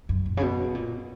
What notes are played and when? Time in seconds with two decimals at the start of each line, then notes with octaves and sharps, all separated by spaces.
0.09 F#2
0.26 A#2
0.37 C#3
0.42 B2
0.75 A#2